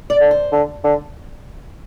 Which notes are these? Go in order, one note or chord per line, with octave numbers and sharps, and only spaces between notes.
D5
D3
C5
D3
D3